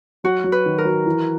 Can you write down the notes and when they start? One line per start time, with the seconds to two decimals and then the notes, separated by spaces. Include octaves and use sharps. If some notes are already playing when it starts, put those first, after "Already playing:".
0.24 F#3 F#4
0.44 F#3
0.52 B4
0.66 D#3
0.78 A#4
0.85 F#3
1.06 E3